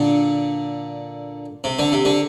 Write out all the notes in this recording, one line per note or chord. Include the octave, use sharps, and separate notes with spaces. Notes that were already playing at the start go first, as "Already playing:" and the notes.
Already playing: A#2 D3
C3
D3
C3
D3